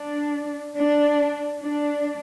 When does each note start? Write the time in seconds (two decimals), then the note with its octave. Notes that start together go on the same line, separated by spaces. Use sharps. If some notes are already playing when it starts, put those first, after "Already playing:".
Already playing: D4
0.76 D4
1.60 D4